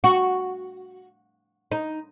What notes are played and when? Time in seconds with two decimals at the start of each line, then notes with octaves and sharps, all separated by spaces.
0.04 F#4
1.72 D#4